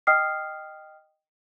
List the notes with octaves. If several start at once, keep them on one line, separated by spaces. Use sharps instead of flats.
D#5 G5 D#6 F6 C7